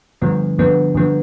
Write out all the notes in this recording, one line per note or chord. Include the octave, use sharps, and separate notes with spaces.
G2 D3 F3 B3
G2 D3 F3 B3
G2 D3 F3 B3